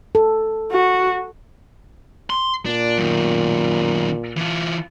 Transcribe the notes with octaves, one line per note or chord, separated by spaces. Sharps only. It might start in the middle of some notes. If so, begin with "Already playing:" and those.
A4
F#4
C6
A#2 D4
F#2 D#3
E3 F4